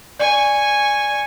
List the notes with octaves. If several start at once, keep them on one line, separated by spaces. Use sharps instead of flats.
D5 G#5 C#6